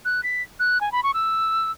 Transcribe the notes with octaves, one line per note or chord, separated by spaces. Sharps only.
F#6
B6
F#6
G#5
B5
C#6
E6